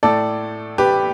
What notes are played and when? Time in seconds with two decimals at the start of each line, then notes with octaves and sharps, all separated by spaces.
0.03 A2 A3 A4 D5
0.78 G4 B4